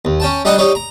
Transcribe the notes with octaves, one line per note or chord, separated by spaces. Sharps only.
D#2
C#4 G5 A5
G3 D4 D#4 D5 F#5 G5
D#4 G4 C#5 D5
A#5